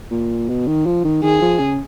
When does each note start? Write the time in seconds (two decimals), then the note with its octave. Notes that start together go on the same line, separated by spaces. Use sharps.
0.11 A#2
0.49 B2
0.67 D#3
0.86 F3
1.05 D#3
1.23 D#3 G#4
1.42 F3
1.60 C#3